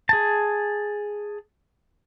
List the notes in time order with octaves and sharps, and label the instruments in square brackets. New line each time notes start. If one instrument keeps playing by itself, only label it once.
[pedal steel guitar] G#4 A5